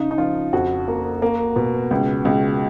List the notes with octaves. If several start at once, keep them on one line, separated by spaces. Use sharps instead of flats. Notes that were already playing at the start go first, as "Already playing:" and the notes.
Already playing: C#3 D#4
D#4
F3 F4
F2 F#4
A#3
A#3
B2
C#2
C#2